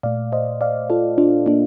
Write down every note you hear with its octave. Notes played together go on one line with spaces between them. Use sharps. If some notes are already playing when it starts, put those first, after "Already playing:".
A#2 A3 D5 F5
C5 D#5
D5 F5
F4 A4
D4 F4
A#3 D4